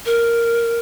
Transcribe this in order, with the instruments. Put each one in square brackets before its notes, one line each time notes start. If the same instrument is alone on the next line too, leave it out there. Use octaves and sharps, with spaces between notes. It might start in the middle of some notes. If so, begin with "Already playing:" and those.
[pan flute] A#4